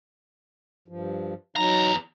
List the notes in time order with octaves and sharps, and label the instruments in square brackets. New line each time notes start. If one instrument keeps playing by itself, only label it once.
[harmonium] G2 F3
[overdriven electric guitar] E2 A#5 [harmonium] F#3 D#4